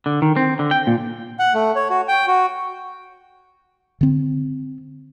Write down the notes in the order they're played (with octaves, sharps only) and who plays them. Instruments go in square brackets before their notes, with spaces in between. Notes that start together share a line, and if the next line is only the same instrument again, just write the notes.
[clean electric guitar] D3
D#3
C4
D3
G5
A#2
[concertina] F#5
A3
C#5
F#4
G5
F#4
[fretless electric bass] D3 C4